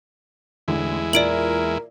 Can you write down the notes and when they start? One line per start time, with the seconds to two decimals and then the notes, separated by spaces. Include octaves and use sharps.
0.68 A1 E2 D3 G#3 E4
1.13 A#2 E3 A#4 D5 E5 D7 F#7